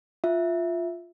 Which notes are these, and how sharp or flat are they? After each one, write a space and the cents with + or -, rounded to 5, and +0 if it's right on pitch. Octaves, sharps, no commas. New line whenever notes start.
F4 +0 E5 +0